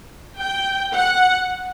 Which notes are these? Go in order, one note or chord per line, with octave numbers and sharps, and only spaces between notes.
G5
F#5